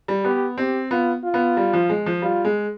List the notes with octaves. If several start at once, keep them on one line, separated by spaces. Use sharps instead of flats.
G3
B3 G4
C4 G4
B3 F4
F4
B3
G3
F3
G#3
F3
G3 F4
G#3